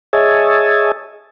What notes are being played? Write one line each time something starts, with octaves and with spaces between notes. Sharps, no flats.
G#4 C#5 D#5 E5 G#5 A5